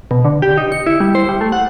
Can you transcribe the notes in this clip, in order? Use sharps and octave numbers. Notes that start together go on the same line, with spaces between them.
B2
D3
G4
D#4
C#7
E4
G3
C5
G3
A3
F#5